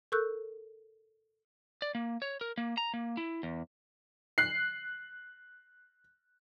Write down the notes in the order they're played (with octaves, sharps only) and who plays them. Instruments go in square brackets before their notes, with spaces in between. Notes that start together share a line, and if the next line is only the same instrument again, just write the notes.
[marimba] A4 A#4 C#6 E6 F#6 G6
[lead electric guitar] D5
A#3
C#5
A#4
A#3
A#5
A#3
E4
E2
[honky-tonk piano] F#6 C7